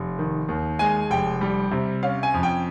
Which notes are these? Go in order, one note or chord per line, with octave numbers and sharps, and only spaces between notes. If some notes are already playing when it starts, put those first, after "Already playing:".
Already playing: F1
D#3
D#2
G#3 G#5
F1 G5
G3
C3
C#4 F5
G#5
F2
G5